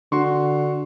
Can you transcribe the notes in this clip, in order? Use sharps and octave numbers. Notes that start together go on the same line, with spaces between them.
D3 F#4 C6 C#6